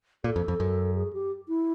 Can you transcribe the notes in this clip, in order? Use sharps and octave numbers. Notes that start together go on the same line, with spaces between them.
A#2 A4
F2
F2
F#2
G#4
G4
E4